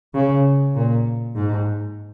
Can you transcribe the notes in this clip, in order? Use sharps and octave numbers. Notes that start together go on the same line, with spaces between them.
C#3
A#2
G#2